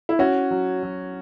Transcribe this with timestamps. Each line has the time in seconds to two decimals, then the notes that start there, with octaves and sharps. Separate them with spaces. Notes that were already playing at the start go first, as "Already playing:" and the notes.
0.09 E4
0.19 C#4 F#4
0.51 F#3
0.83 F#3